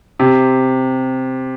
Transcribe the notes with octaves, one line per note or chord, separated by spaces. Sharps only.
C3